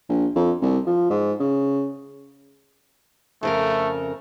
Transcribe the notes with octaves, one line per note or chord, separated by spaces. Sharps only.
A#1
F2
C2
F3
G#2
C#3
F2 C#3 A3 A#4